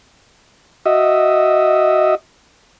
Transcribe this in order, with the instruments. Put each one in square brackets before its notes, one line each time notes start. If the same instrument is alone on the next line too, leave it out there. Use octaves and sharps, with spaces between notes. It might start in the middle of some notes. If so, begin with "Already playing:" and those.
[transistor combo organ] F#4 D#5 E5